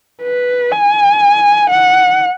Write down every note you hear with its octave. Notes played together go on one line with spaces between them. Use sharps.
B4
G#5
F#5